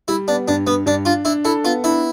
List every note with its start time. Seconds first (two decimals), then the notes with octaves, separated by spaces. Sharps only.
0.08 G3 E4
0.28 B3 D4
0.48 G2 D4
0.67 G2 B3
0.86 G2 D4
1.05 D4 F4
1.25 D4 E4
1.45 E4 A4
1.64 B3 F4
1.84 D4 E4